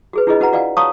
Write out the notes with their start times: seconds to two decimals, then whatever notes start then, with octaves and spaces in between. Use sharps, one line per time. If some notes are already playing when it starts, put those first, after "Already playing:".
0.13 F#4 G#4 B4
0.27 D4 E4 F4 G#4 B4 D#5
0.40 C#4 F#4 B4 F#5 A#5
0.52 F4 F#4 D5 F5 F#5 G#5
0.77 C#5 F5 A5 A#5 C#6 D#6